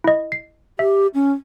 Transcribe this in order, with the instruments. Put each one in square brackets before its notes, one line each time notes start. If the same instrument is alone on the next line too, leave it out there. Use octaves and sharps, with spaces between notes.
[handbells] E4 D#5
C7
[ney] G4 [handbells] E5
[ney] C#4